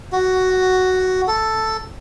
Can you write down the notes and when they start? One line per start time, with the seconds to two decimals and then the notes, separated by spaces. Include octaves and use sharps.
0.12 F#4
1.28 A4